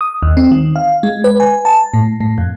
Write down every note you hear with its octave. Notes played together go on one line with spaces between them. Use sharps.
D#6
D#2
C4
D#3
F5
G#3
B4
G#5
A5
A2
A2
F2